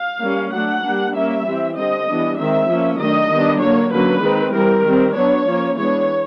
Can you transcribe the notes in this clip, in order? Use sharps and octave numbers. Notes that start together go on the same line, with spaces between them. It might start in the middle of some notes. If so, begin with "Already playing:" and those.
Already playing: F5
G3 A#3 C#4
F#3 A3 D4 F#5
G3 A#3 D4
G3 A#3 C#4 E5
E3 G3 C4
D3 G3 C4 D#5
E3 G3 B3 D4
D#3 G#3 C4 E5
F3 A#3 C#4
D#3 F#3 A3 D4 D#5
D#3 G3 B3 D4
D3 F#3 A#3 C#5
D3 F#3 A#3 C#4 B4
D#3 G#3 C4
E3 G3 C4 A#4
D#3 G3 C4
F#3 B3 D4 C#5
F3 A#3 C#4
E3 G#3 B3 D4 C#5